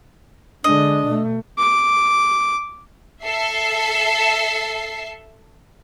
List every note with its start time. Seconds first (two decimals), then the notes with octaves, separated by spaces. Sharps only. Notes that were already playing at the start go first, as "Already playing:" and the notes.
0.64 D3 G#3 D4 D#5
1.06 B2 A3
1.58 D6
3.24 A4 E5 C7